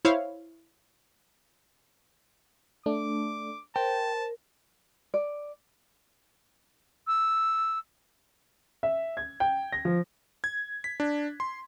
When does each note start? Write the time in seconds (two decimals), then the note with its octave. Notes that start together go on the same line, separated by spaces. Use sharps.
0.05 E4 C5 C#5 F5
2.86 A3 D4 D6
3.76 A#4 C5 G5 A5
5.14 D5
7.07 E6
8.83 E5
9.17 G#6
9.40 G5
9.72 A#6
9.85 F3
10.44 G#6
10.84 B6
11.00 D4
11.40 C6